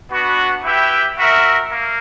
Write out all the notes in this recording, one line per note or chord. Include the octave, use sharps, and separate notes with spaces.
B3 D4 F#4 B4
E4 G4 B4 E5 G5
F#4 A#4 E5
A#3